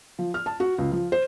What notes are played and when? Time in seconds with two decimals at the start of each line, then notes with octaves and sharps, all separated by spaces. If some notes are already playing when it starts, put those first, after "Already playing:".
0.19 F3
0.34 F6
0.46 A5
0.60 F#4
0.78 C#2
0.92 F3
1.12 C5